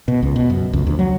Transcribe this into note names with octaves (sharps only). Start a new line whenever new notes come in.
B2
C#2
B2
F#2
C#2
D2
F#3